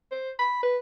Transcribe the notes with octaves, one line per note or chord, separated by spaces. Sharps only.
C5
B5
B4